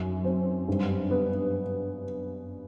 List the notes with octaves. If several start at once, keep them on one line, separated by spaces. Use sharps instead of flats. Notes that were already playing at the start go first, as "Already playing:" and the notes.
Already playing: F#2
C4
G2
B3